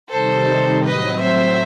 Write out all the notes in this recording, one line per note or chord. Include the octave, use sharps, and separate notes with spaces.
C3 D#3 G3 D#4 A4 C5
A2 F#3 C4 B4 D#5
C5 E5